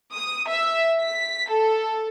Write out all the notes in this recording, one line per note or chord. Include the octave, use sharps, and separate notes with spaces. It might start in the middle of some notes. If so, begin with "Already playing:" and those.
D#6
E5
B6
A4